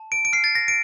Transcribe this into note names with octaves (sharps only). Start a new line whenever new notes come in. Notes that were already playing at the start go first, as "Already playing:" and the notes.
Already playing: A5
D7
D7
F6 C7
A6
A#6
D7